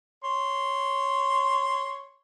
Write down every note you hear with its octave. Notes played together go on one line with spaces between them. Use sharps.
C#5 C6